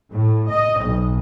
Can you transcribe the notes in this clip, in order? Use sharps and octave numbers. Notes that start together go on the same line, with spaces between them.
A2
D#5
B1